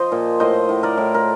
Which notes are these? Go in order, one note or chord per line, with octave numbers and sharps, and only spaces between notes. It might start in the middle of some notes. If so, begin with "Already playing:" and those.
Already playing: F3 C5 D#5
A#2
A2 C5 D#5
A2
A#4 D5
A2
A#4